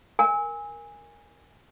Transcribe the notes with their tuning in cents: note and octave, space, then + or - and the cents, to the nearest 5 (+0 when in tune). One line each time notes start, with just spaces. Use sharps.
A#4 +0 G#5 -15